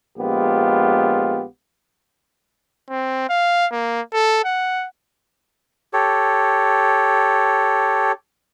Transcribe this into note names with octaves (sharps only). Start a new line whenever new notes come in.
A#1 G#3 B3 F4 G4
C4
F5
A#3
A4
F#5
G4 A4 C#5